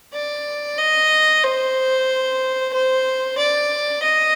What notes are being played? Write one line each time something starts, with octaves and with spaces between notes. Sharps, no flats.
D5
D#5
C5
C5
D5
D#5